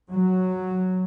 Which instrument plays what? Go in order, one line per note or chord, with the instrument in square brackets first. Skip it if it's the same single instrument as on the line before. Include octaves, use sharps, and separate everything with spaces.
[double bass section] F#3